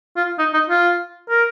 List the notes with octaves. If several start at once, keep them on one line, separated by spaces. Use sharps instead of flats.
F4
D#4
D#4
F4
A#4